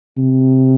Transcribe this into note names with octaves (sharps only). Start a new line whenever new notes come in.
C3